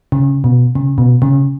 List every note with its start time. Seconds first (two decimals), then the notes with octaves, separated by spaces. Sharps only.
0.12 C#3
0.44 B2
0.75 C#3
0.98 B2
1.22 C#3